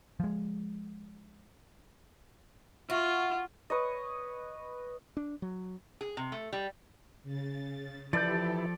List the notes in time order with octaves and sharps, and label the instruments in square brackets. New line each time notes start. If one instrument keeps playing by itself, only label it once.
[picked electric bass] F3 G#3
[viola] F4 [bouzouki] F#4 [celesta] E5 C#6
[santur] B4 C#5 D#5
[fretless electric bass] D4
F#3
[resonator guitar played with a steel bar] G#4
C3
A3
G3
[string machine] C#3 A6
[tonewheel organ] E3 E4 [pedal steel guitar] F3 A4 G6 [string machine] G4 [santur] D5